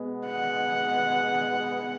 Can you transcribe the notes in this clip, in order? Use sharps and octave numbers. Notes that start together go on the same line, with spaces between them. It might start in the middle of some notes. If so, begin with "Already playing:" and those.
Already playing: B2 G#3 B3
F#5